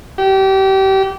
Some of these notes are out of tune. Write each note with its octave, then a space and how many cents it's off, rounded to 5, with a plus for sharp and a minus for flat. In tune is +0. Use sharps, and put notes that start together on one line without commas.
G4 -30